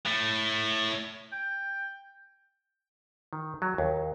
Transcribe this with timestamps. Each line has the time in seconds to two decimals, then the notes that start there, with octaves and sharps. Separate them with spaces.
0.06 A2 A3
1.32 G5
3.33 D#3
3.62 F#3
3.78 D#2